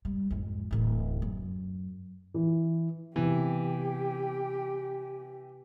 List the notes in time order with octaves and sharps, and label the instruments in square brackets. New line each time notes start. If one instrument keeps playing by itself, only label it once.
[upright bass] G3
F2 G#2
D1 A1
F#2
[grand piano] E3
[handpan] C3 B3 [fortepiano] E3 [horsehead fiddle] G4